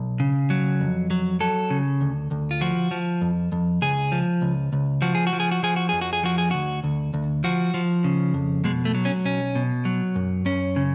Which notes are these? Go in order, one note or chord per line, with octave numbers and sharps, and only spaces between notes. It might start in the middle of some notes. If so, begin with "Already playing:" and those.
Already playing: B1
C#3
F#3
F2
F#3
F#3 A4
C#3
D2
D2
F4
F3 F#4
F3
F2
F2
C#2 G#4
F3
C#2
C#2
F3 F#4
G#4
F#4
F3
G#4
F#4
F3 G#4
F#4
F2 G#4
F#4
G#4
F3 F#4
G#4
D2 F#4
D2
D2
F3 F#4
F3
C#3
F2
B2 G#3
A3
F#3
C#4
B1 C#4
B2
F#3
F#2
F#2 C#4
C#3